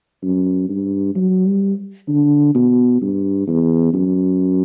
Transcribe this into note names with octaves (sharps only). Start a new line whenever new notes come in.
F#2
G2
F#3
G3
D3
B2
G2
E2
F#2